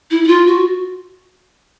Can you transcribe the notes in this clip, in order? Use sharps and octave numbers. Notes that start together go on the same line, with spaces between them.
E4
E4
F4
F#4